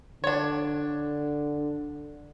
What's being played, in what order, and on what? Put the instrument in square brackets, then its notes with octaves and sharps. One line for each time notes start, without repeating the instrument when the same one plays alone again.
[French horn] D3 [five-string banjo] D4 C#5